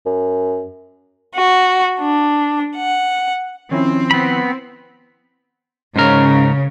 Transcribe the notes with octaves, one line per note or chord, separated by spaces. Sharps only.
F#2
F#4
D4
F#5
D#3 F3 C4 C#4 E4
B3 B5
G#2 C#3 A#4